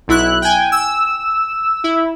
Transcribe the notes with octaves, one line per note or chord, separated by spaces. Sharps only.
B1 E4 F#6
G5 G#5
E6
E4